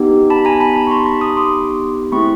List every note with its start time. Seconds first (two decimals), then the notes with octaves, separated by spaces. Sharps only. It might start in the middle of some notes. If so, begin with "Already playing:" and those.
Already playing: B3 D#4 G4
0.30 A5 B5
0.45 G#5 A#5
0.61 A5 B5
0.76 A5 B5
0.87 C#6
0.91 A#5 C6
1.06 B5 C#6
1.21 C#6 D#6
1.37 C6 D6
2.12 A3 C4 E4 G#4 B5 C#6